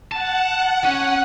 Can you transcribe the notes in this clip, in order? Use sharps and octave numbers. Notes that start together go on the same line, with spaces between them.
F#5 A5
C#4